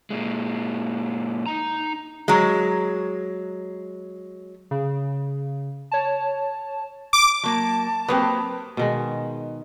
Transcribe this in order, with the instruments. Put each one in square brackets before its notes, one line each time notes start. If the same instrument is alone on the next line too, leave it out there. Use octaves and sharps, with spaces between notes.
[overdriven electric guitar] A#2 G#3
D#4 A#5
[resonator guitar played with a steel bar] F#3 G#3
[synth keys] C#3
C#5 A5
[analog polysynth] D6
[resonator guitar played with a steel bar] F#3 A#3 [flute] A5
[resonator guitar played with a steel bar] F#3 A#3 C4 [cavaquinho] G4 A#4 D#6 [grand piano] B4
[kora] B2 D#3 G#3